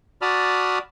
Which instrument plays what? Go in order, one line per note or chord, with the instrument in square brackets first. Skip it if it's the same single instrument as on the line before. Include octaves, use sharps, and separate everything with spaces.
[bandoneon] F#4 D5 A5 B5 D#6 F6